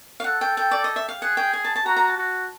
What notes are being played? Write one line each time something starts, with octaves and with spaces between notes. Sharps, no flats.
F5
A4 F#5
G5
G5
D5
D#5
E5
F5
G#4 F#5
G5
G#5
A5
A5
F#4 A#5
A#5
A5
F#4